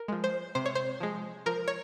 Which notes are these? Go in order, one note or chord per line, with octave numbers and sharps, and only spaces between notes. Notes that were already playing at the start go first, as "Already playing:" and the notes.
Already playing: A#4
F3 G#3
C5
C3 C5
C#5
C5
F3 G#3
F3 A#4
C#5